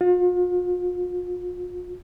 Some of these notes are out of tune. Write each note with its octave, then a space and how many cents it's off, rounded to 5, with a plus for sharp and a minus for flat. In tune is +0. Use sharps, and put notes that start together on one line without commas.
F4 +40